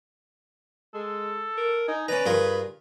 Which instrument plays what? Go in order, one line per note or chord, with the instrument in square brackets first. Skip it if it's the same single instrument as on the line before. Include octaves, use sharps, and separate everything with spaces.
[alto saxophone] G#3 [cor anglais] A4
[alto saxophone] A#4
[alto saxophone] D#4 [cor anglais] G#5
[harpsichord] C#4 A#5 [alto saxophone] B4 [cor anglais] D5
[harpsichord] G2 F4 A#4 [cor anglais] G#4